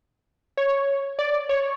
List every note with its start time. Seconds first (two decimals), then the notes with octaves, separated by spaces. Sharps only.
0.57 C#5
1.19 D5
1.49 C#5